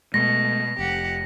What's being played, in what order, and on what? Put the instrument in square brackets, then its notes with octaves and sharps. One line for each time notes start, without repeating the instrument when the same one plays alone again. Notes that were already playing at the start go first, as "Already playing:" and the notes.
[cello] B2 [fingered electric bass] G#3 A3 [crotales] A#6
[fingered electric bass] F1 [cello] G4 F#5